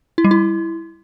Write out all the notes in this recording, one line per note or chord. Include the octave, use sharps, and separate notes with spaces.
E4
G3
E4